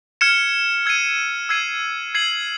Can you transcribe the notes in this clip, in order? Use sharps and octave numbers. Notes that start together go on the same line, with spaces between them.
F6 G#6 C#7 E7
E6 G#6 C7 D#7
E6 G#6 C7 D#7
G#6 C7 D#7 F#7